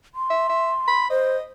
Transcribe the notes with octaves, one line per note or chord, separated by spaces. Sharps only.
C6
E5
E5
B5
C5 D#5